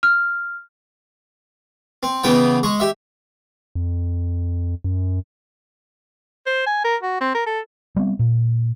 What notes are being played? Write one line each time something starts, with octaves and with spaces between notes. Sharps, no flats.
F6
C4
C#3 E3 B3 G5
G#3 C#6
G4 E5
F2
F#2
C5
G#5
A#4
F#4
C4
A#4
A4
G3 B3 C4
A#2